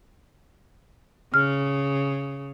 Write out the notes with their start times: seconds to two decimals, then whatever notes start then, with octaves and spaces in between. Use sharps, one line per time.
1.34 C#3 F6